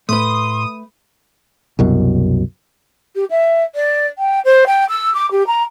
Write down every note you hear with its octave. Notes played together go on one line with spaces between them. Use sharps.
A2 A3 B4 C6 D#6
C2 F#2 B2
G4
E5
D5
G5
C5
G5
E6
D6
G4
A#5